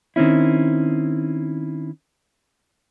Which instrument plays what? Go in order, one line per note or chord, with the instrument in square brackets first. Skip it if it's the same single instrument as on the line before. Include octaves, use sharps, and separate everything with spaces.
[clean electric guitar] D#3 C4 C#4 E4